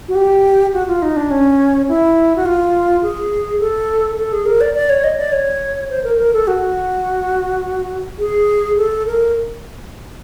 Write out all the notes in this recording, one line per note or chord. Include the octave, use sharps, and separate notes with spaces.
F#4
G4
F#4
F4
D#4
D4
C#4
E4
F#4
F4
G#4
A4
A4
G#4
A#4
D5
D5
C#5
D#5
D5
C#5
C5
A#4
A#4
A4
F#4
G#4
A4
A#4